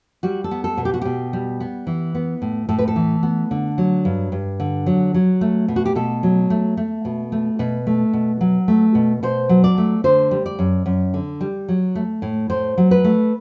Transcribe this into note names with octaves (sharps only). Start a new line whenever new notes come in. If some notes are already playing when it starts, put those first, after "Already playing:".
G3 F#4
A4
B3
A4
B2
G4
F#4
B2 G4
G3
B3
E3
B3
A2
A2 A4
B4
A4
E3
B3
D3
F#3
G2
G2
D3
F#3
F#3
A3
B2
F#4
G4
B2 A4
F#3
A3
A3
B2
A3
B2 B4
A3
B2
F#3
A3
B2
B2 C5
F#3
D5
A3
D3 C5
G3
D5
F#2
F#2
D3
G3
F#3
A3
A2
A2 C5
F#3
B4
A3